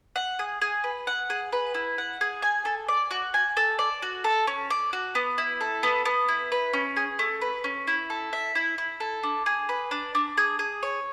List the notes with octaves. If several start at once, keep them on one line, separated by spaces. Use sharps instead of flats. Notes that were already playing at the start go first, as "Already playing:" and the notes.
F#5
G#4
G#4
B4
F#5
G#4
B4
E4
F#5
G#4
G#5
A4
D5
F#4
G#5
A4
D5
F#4
A4
C#4
D5
F#4
B3
E4
A4
B3
B3
E4
B4
C#4
G#4
A3
B4
C#4
E4
A4
E5
E4
E4
A4
D4
G#4
B4
D4
D4
G#4
G#4
C#5